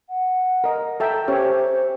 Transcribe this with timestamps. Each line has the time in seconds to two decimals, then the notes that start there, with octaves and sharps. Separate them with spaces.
0.09 F#5
0.64 A#4 D#5
1.00 A4 E5 G5 A#5
1.28 C#4 G4 C5 C#5